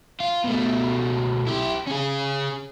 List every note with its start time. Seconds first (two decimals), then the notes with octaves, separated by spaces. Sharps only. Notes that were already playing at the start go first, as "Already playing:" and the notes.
0.20 F4
0.44 B2 A3
1.47 E4 G4
1.87 C#4 G#4